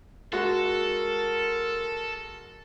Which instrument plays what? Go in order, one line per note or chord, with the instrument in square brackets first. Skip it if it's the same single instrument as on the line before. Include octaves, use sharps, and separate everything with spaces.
[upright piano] G#3 F#4 [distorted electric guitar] A4 [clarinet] A#4